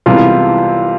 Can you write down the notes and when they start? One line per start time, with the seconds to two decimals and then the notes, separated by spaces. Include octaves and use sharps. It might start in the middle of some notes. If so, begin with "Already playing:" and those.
0.06 C2 C3 E3 G#3 B3 F4